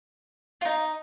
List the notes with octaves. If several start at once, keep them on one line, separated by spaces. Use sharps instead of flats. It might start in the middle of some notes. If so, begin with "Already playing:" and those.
F4
D#4